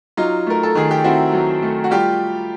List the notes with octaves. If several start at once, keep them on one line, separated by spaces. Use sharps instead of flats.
F#3 D#4 F4
A3 A#4
A4
D#3 G#4
G4
C4 E4 F#4
F#3
A3
F#4
G3 F4 G4